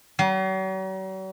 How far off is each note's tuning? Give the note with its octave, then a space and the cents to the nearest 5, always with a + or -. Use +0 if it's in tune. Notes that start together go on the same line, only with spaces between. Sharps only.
F#3 +45